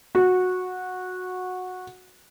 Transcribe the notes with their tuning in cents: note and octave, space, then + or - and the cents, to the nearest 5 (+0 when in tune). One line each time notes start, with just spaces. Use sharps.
F#4 -15